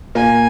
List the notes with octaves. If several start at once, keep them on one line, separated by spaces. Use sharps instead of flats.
A#2 A#3 G#5